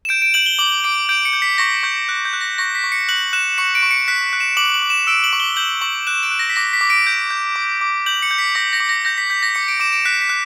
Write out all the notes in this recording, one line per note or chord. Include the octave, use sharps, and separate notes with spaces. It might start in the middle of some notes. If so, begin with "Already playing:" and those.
E7
G6 D7
D7
G6 F#7
G7
D6 F#7
D6 D7
G6 D7
C#7
G6
B6
C#6 A#6
C#6 G6
F#6
G6
F#6
A#6
C#6 A#6
B6
C#6
C#7
F#6 F#7
F#6 E7
C#6 C#7
D7
C#6
C#7
F#6 B6
F#6
E7
D6 F#7
F#7
D6
E7
E6 D7
F#7
C#6
G7
G6 F#7
C#6 F#7
F#6 E7
D7
F#6
A#6
B6
D6 A#6
B6
D6
D7
G6
G6
D6
D6
G6 F#7
C#7
G6
B6
D6 A#6
A#6
D6
A#6
G6 A#6
B6
G6 B6
A#6
D6 C#7
D7
D6 E7
D7
F#6 B6
B6
F#6